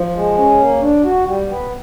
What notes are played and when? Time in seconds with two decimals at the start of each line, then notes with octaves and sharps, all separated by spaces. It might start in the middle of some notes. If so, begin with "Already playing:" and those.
Already playing: F3
0.16 G#3
0.37 C#4
0.60 A#3
0.81 D4
1.04 F#4
1.27 G3
1.49 B3